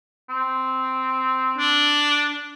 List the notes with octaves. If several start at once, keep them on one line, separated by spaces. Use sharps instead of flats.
C4
D4